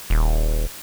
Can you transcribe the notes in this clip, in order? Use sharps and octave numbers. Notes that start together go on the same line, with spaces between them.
D#1